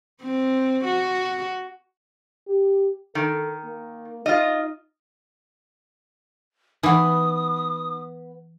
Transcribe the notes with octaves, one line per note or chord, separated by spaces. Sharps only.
C4
F#4
G4
D#3 A4
A#3
D#4 F4 D#5
E3 B3 D#4 B4 F#5 D#6